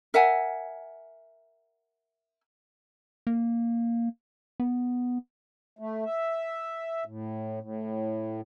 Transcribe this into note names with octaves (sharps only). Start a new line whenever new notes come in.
A#4 E5 F#5 G#5
A#3
B3
A3
E5
A2
A2